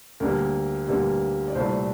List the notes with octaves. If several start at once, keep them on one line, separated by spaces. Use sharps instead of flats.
D2 D3 G3 A#3 A#4
D2 D3 G3 A#3
D5
C2 A#2 A3 C5